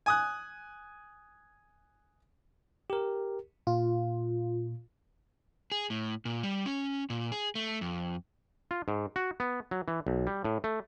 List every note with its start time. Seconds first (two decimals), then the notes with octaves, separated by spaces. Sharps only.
0.06 G#5 D#6 F#6
2.90 G4 A#4
3.67 A#2 F4
5.72 G#4
5.90 A2
6.25 A#2
6.43 G3
6.66 C#4
7.10 A#2
7.32 G#4
7.55 A3
7.81 F2
8.71 F4
8.88 G#2
9.16 F#4
9.40 B3
9.71 F#3
9.88 E3
10.07 B1
10.27 G3
10.44 A2
10.64 A3